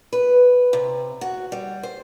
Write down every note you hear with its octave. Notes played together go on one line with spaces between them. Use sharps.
B4
C3
F#4
G3
C5